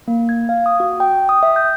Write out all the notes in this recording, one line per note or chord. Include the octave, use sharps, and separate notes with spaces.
A#3
G#6
F5
D#6
F#4
G5
D#6
E5
G6